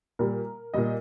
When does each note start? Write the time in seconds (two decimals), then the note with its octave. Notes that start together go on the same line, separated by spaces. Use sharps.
0.19 A#2 G3 A#4
0.74 A#2 G3 D#5